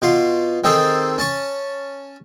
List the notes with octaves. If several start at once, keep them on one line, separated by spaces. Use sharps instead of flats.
B2 F4 C6
D#3 C4 G#4 A4 C5
C#4 A5 C#6